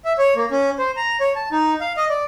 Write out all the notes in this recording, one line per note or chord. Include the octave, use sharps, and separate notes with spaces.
E5
C#5
A#3
C#4
C5
A#5
C#5
A5
D#4
F5
D#5
D5